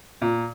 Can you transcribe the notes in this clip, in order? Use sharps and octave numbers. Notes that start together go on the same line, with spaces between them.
A#2